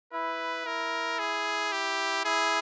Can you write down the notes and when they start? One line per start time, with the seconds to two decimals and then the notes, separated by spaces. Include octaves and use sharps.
0.13 E4 B4
0.66 E4 A#4
1.19 G#4
1.72 G4
2.25 E4 G#4